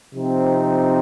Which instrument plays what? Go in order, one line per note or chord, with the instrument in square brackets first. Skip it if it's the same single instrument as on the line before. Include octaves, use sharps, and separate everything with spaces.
[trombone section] C3 F3 C4 D#4